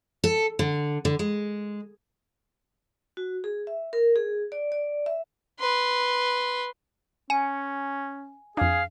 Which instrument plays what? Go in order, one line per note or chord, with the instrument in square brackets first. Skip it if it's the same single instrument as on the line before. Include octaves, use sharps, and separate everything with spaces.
[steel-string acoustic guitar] A4
D3
D3
G#3
[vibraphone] F#4
G#4
E5
A#4
G#4
D5
D5
E5
[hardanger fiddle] B4 C6
[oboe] C#4 [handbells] G#5 [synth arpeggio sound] D#7
[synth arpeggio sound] F2 D4 [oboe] G#4 [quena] F5